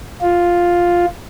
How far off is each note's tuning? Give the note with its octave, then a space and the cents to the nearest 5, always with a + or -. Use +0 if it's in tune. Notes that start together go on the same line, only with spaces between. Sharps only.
F4 +5